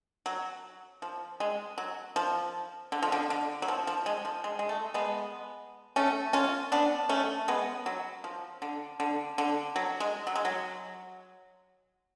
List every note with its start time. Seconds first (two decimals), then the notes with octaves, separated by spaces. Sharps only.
0.26 F#3
1.02 F3
1.40 G#3
1.78 F#3
2.16 F3
2.92 D3
3.03 F3
3.12 D3
3.30 D3
3.62 F#3
3.68 F3
3.87 F3
4.06 G#3
4.25 F3
4.44 G#3
4.59 G#3
4.69 A3
4.94 G#3 B3
5.96 A3 C#4
6.33 C#4 F4
6.72 B3 D4
7.09 A3 C#4
7.48 G#3 B3
7.86 F#3
8.24 F3
8.62 D3
9.00 D3
9.38 D3
9.76 F#3
10.00 G#3
10.27 F#3
10.35 G#3
10.45 F#3